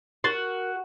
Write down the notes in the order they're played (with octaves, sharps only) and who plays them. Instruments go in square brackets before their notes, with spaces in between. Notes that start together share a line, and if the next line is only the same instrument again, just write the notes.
[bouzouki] F#4 [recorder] A#4 [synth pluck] C6 A6